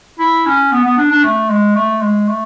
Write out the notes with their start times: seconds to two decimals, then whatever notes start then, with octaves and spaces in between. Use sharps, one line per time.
0.19 E4
0.46 C#4
0.72 B3
0.85 B3
0.97 D4
1.11 D4
1.23 A3
1.49 G#3
1.75 A3
2.01 G#3
2.28 A3